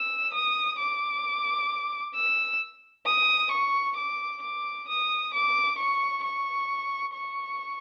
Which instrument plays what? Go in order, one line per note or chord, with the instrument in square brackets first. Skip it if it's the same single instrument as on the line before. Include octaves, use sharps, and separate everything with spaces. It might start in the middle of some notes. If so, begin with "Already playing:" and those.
Already playing: [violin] E6
D#6
D6
E6
D#6
C#6
D6
D6
D#6
D6
C#6
C#6
C#6